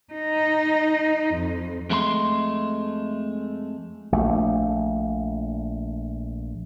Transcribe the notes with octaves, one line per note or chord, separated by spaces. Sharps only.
D#4
F2
F2 G#3 A3 B5 C6
A#1 A3